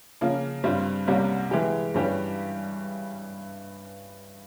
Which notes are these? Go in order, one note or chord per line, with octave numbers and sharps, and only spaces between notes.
C#3 F3 A#3
G2 G3 C4 F4
C2 C3 G3 A#3 C#4
E3 G#3 E4 G4
G2 E3 G3 C#4 G4